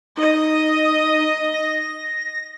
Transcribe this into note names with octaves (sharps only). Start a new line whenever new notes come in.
D#4 D#5
A#6